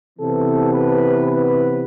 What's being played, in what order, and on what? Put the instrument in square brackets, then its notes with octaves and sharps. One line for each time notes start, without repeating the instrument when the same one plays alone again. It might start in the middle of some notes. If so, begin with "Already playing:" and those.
[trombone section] C3 E3 B3 A4
B4
B4